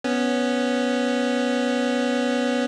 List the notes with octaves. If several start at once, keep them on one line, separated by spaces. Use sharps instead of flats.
B3 C#4